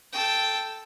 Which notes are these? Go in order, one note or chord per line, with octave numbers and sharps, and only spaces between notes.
A4 G5